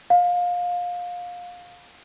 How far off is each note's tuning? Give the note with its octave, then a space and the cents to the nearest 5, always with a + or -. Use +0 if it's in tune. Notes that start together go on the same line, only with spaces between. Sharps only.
F5 +25